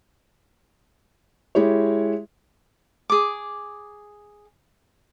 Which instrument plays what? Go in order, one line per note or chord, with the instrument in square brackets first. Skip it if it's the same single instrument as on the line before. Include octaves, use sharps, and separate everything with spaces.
[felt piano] G#3 E4 G4 C#5
[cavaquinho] G#4 D6